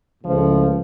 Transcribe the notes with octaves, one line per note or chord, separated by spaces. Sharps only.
C#2 A2 F3